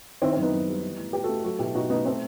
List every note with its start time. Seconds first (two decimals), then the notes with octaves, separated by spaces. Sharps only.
0.22 D#3 C4 E4
0.32 C4
0.37 F#2
0.42 B3 D#4
0.52 F#2
0.68 G3
0.83 E3
0.98 A2
1.13 A2 G4 B4
1.24 F#4 A4
1.29 A3
1.44 F#3 F#4 A4
1.59 B2 E4 G4
1.74 B2 D#4 F#4
1.90 A3 B3 D#4
2.05 A3 C4